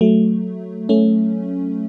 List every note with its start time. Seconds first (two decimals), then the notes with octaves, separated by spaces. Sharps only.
0.01 F#3 A3
0.89 A3 C#4